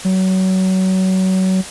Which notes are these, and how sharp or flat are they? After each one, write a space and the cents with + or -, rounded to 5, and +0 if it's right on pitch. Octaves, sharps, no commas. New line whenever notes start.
F#3 +25